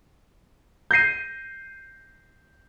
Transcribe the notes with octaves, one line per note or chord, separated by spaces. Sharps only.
G6 A#6 C7 D#7